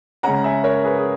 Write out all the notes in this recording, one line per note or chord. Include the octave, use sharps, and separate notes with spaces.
C#3 G#3 C#4 F#5 A#5
E5 G#5
A#4 C#5
G#4 B4
G#4